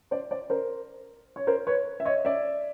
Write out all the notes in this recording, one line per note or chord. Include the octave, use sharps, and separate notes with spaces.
C5 D5
C5 D5
A#4 C5
C#5
A#4 C5
B4 C#5
E5
C#5 D#5
D5 E5